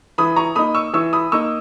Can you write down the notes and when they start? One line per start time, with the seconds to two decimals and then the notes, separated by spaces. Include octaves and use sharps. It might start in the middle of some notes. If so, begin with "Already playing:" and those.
0.18 E3 B5 D#6
0.36 A#5 C#6
0.55 A#3 D#4 B5 D#6
0.75 C#6 E6
0.93 E3 C#6 E6
1.13 B5 D#6
1.32 A#3 D#4 C#6 E6